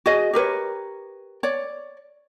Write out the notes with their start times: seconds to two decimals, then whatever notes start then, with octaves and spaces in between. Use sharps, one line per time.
0.06 F#4 G#4 D#5
0.33 G4 A#4 B4 C#5
1.43 C#5 D5